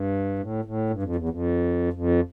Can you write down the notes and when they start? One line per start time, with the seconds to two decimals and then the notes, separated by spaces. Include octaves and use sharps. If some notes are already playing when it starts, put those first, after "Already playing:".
Already playing: G2
0.39 A2
0.65 A2
0.90 G2
1.03 F2
1.16 E2
1.29 F2
1.93 F2